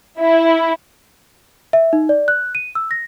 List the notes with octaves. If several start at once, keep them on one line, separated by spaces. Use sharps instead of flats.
E4
E5
D#4
D5
F#6
D#7
E6
A#6